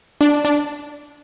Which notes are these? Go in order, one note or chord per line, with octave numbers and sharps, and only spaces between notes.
D4
D4